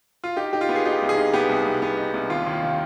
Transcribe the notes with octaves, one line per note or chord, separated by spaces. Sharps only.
F4
D#4 G4
D#4 G4
F4
B3
G#4
D#4 G4
C2
G#4
D#4
B3 G4
C2
C2
B3
D#4
C2
D#2 F4
D#2
F4
D#3